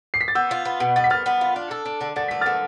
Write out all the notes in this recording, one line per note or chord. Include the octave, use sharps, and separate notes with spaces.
C7
B6
A6
B3 E6 G6
F4
B3
B2
B3 A6
B6
B3 F6 A6
B3
F4
D4
A4
D4
D3
D3 A6
A3 B6
D3 F6 A6